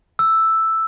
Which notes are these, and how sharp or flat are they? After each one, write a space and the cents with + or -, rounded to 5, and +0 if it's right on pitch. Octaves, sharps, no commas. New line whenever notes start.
E6 +0